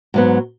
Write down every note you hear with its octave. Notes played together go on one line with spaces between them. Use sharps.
G#2 F#3 B3